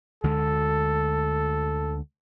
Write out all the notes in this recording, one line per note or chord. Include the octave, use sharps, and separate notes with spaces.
D2 D3 G#3 A4